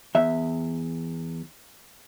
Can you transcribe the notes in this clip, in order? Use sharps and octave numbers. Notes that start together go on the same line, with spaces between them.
E2 E5